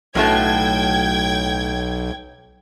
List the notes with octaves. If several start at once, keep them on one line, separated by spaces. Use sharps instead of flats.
B1 A2 F#3 A3 G5 G#6